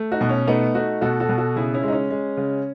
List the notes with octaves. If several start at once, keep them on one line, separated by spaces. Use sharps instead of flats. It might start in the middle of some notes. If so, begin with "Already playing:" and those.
Already playing: A3
D#4 F#4
B2
C#4
A3 B3 D#4
A3 D#4 F#4
B2 F#4 A4
F#4 A4
B2
F#4 A4
C#3 E4 G#4
C#4 E4
G#3
D#4
C#4
G#3
C#3